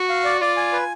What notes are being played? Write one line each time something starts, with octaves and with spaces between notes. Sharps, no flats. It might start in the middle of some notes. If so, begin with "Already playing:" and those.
Already playing: F#4
F5
D5
F4 D5
G#5
B4